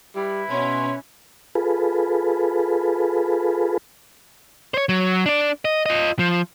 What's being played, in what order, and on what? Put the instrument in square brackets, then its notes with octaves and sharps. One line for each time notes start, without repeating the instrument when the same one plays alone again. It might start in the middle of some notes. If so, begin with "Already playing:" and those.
[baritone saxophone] G3 [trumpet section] E4 B4
[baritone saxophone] B2 [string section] C#4 [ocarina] C6
[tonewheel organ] F4 G#4 A4 B4
[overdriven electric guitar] C5 C#5
F#3
D4 D5
D#5
F4 D#5
F3